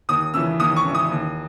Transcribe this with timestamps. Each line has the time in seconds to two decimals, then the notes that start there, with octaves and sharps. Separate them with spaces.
0.09 D#2 D#6
0.34 C#3 E3 E6
0.60 D#2 D#6
0.76 C#6
0.85 C#3 E3
0.95 D#6
1.11 D#2